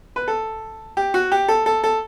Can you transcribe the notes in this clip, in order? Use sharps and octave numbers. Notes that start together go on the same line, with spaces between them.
B4
A4
G4
F#4
G4
A4
A4
A4